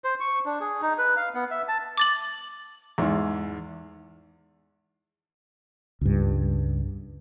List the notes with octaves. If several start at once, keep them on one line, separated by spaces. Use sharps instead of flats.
C5
C#6
D4
G#4
D#4
B4
F5
B3
E5
A5
D6 A6 F#7
E2 G#2
C#2 G2